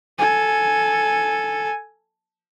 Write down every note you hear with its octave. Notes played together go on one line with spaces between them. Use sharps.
A4 G#5